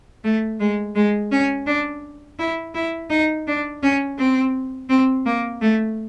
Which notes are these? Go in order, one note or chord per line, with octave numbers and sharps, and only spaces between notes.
A3
G#3
G#3
C#4
D4
E4
E4
D#4
D4
C#4
C4
C4
A#3
A3